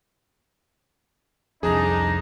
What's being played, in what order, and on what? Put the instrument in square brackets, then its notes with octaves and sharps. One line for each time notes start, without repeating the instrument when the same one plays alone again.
[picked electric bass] C2 F2 [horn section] D4 D#4 [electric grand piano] G#4